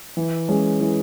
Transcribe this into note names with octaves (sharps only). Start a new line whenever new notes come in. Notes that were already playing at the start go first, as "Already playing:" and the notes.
E3
G#3 C#4 G#4
E3